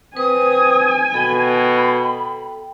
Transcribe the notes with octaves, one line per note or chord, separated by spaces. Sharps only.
C4 B4 G#5 D#6
B2 A4 G5 B5